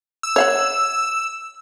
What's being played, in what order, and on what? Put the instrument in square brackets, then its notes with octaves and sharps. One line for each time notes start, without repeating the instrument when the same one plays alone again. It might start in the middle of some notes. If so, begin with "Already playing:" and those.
[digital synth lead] E6
[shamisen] C#5 F5 F#5